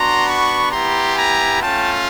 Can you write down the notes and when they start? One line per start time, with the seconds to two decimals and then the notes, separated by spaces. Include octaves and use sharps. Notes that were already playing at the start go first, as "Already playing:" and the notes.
Already playing: B3 D4 F#4 A#5 C6
0.26 B5 C#6
0.71 B3 E4 G4 A#5 C6
1.16 G#5 A#5
1.62 A3 C#4 F4 G5 A5